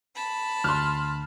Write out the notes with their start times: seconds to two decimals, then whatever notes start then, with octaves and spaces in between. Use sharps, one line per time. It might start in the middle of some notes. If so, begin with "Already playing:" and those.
0.16 A5 B5
0.64 D2 C6 F6 F#6